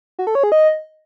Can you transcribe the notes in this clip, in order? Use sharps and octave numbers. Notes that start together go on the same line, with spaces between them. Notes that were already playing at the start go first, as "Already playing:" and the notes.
F#4
A4
C#5
G#4
D#5